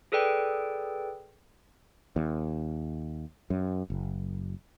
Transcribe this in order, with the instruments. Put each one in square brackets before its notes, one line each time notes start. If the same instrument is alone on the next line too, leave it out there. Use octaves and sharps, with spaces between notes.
[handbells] G#4 A4 B4 D5 G5
[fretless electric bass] D#2
F#2
F#1